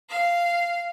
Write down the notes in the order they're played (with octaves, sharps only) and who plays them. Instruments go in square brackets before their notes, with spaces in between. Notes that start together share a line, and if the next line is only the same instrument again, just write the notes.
[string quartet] F5